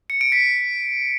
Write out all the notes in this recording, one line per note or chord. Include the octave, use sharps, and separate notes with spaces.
C#7
D7
B6